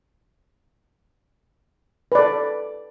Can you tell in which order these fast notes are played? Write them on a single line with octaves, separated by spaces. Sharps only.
B4 D5 A4